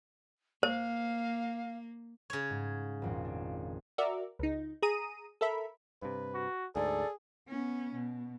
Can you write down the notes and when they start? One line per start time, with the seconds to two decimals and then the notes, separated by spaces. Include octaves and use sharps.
0.63 A#3 C5 F5
2.30 C#3 C#5
2.50 G#2
3.02 G#1 F2 A#2
3.25 D4
3.98 F#4 A#4 D5 E5
4.39 C#2 D#4
4.82 G#4 A#5 D#6 D#7
5.41 A4 A#4 E5 B5
6.02 G2 C3 B4
6.34 F#4
6.76 D2 G#2 G#4 A4 D5
7.48 B3 C#4
7.94 B2